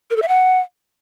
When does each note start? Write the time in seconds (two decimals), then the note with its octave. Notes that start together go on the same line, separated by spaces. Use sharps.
0.10 A#4
0.16 A4
0.22 E5
0.28 F#5